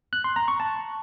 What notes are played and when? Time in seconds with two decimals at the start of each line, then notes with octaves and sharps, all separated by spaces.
0.13 F#6
0.24 C6
0.36 A#5
0.48 C#6
0.60 A5